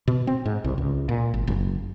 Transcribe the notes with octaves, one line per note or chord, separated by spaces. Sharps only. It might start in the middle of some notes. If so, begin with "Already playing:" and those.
B2
C4
G#2
C2
C#2
A#2
G#1
F#1